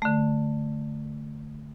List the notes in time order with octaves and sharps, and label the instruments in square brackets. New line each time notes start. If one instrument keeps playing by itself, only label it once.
[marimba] D3 A3